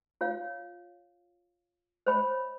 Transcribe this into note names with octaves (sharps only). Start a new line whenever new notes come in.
F4 C#5 F5
C5 C#5 D#5 B5